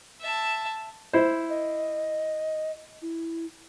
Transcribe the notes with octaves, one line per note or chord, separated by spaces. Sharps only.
E5 A5
E4 C5
D#5
E4